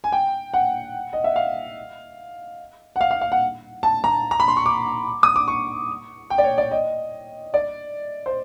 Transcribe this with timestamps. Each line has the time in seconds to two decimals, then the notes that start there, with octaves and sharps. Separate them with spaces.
0.04 G#5
0.12 G5
0.54 F#5
1.13 D#5
1.24 E5
1.36 F5
2.96 F#5
3.01 F5
3.11 F5
3.21 F5
3.32 F#5
3.83 A5
4.04 A#5
4.31 A#5
4.40 B5
4.48 C6
4.57 C#6
4.66 D6
5.23 D#6
5.36 D6
5.48 C#6
6.30 G5
6.38 D5
6.44 C#5
6.58 D5
6.71 D#5
7.54 D5
8.26 C5